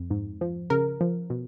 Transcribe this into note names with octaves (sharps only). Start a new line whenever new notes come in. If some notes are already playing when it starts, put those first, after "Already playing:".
Already playing: F2
G#2
F3
C#3 A#4
F3
B2